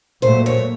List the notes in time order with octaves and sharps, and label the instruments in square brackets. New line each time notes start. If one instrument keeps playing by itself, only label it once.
[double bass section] A#2 F#3 A3 [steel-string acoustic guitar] C5
[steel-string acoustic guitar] C#5